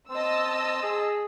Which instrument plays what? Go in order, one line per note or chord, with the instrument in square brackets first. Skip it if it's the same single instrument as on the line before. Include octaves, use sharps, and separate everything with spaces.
[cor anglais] C4 [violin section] D#5 A5 E6
[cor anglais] G#4